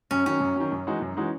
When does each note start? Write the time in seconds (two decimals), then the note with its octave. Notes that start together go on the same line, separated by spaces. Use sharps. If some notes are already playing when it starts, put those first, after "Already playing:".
0.11 F#2 C#4
0.26 D#3 F#3 C#4
0.40 F#2
0.56 D#3 F#3
0.72 F#2
0.87 E3 G#3 D#4 F#4
1.01 F#2
1.17 E3 G#3 D#4 F#4